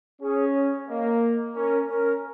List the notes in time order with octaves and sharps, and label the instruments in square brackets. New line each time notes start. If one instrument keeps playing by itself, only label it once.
[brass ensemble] C#4 [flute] G#4
[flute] C#5
[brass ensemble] A#3 [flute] D#5
[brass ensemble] C#4 [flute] A#4
[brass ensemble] C#4 [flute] A#4